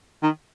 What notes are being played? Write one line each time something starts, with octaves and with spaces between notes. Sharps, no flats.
D#3